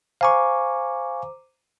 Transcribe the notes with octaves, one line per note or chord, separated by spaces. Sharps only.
C5 F5 G#5 A#5 C#6 D6